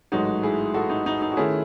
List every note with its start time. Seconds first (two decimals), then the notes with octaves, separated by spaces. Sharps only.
0.12 A1 G#2 F#3 A3 D#4 F#4
0.43 E4 G#4
0.74 F#4 A4
0.90 D#4
1.06 D#4
1.22 D#4
1.32 F#4
1.37 D#3 A3 C#4 E4 G#4